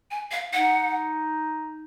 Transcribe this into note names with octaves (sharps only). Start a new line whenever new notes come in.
G#5
F5
D#4 F#5